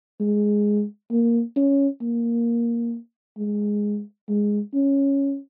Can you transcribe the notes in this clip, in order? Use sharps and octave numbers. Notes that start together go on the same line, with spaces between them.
G#3
A#3
C#4
A#3
G#3
G#3
C#4